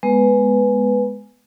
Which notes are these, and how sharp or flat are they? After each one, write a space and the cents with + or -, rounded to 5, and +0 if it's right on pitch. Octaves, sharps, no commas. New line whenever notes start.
G#3 +0 B3 -15 B4 +0